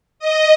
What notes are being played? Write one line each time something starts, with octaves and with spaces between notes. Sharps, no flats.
D#5